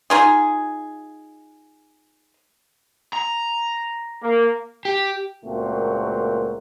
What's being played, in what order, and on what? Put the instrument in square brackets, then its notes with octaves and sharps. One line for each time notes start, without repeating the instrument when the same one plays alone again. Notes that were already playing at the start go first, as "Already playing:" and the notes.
[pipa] D#4 F4 G#4
[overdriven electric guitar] A#5
[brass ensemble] A#3
[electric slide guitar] G4
[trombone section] C#2 A#2 A3 A#3 C4 F#4